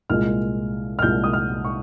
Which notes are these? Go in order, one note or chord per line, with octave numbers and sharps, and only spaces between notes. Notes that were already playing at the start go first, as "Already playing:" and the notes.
C2 A#2 G#3 F6
F6
C2 A#2 G#3 G6
D#6
F6
C#6